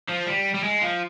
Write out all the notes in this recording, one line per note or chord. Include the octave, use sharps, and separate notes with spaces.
F3
G3
G3
G#3
F3